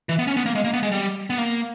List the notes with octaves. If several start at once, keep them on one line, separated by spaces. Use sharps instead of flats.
E3
B3
C#4
B3
A#3
G#3
A#3
B3
G#3
G3
B3
A#3